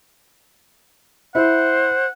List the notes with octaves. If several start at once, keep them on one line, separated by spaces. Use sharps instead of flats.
E4 C5 F#5